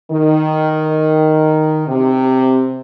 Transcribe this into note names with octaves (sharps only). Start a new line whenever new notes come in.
D#3
C3